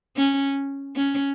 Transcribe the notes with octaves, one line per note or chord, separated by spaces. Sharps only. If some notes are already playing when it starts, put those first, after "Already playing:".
C#4
C#4